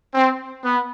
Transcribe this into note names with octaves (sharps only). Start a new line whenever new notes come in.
C4
B3